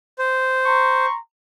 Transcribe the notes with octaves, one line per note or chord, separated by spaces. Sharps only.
C5
A#5 C6 C#6